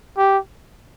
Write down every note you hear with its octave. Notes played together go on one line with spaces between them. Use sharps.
G4